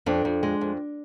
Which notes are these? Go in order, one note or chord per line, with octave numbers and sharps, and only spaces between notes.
F2 D4
F2
G#3
F2